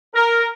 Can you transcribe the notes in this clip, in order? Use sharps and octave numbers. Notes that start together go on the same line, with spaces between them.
A#4